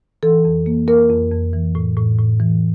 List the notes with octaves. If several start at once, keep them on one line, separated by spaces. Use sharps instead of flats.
E3 A4
F2
A#3
A#3 A#4
F2
F2
E3
A2
A2
A2
E3